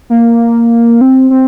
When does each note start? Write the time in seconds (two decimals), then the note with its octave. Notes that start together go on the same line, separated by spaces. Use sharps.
0.10 A#3
1.01 C4
1.30 C4